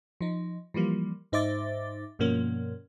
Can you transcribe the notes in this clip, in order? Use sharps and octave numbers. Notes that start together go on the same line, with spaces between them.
F3 D#4
E3 F3 G3 A#3
G#2 D#4 C5 E5 D6 A6
G2 B2 F3 A#3 C#4